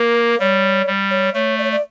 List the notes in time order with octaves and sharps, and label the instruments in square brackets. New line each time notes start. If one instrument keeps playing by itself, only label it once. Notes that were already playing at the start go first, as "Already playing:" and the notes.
Already playing: [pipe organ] A#3 [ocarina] A#4
[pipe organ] G3 [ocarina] C#5
[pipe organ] G3
[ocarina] C#5
[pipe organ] A3 [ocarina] C#5
[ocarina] D5
C#5
D5